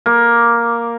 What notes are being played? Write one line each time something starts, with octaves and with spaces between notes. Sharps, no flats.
A#3